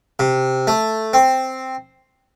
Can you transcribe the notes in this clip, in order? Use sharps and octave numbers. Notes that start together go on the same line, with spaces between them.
C3
A3
C4